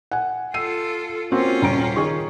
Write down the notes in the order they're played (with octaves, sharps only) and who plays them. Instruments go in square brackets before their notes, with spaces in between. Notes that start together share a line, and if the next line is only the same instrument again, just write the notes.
[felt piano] F#5 G#5
[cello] F4 A4 [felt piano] E6 C7 D#7
[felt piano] A#3 C4 F#4 [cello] C#4 F4
[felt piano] D#1 A#5 D7
D#3 G#4 C#6